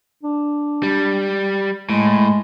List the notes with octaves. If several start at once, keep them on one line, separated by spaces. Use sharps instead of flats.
D4
G3
A2 G#3